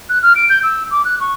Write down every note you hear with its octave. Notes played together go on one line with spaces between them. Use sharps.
F#6
F6
D7
G6
E6
D6
F#6
C#6